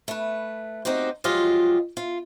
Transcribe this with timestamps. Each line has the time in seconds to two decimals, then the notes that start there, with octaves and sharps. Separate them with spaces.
0.08 A3 B4
0.85 C4 D#4 F#4 G4 C5
1.24 F3 F#3 G#3 F4 G4 D#5
1.97 F4